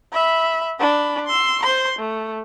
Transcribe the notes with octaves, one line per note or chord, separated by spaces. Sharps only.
E5 B5
D4 B5
C6 E6
C5 C6
A3